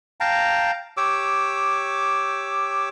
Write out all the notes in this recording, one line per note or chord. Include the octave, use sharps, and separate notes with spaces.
F5 G5 A5 A#5
G4 C#5 D6 E6